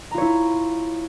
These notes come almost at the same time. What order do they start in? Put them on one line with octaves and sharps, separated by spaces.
A#5 F4 C#5 E4